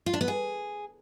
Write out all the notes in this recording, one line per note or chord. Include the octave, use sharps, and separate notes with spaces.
F4
D4
B3
G#4